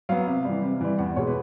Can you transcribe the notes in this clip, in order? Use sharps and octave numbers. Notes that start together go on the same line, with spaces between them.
F#3 B3 F5
C3
E3 G3
C3
E3 G3
E2 F#5
B2 G#3 C#5
B4